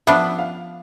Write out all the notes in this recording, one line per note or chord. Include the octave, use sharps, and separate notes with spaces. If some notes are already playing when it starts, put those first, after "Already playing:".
F3 B3 D4 E5
F5